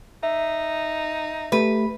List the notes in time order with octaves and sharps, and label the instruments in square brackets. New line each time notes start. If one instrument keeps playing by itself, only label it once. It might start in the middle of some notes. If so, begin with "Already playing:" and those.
[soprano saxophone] D#4 [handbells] E5
[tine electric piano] A3 G4 [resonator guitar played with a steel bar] B4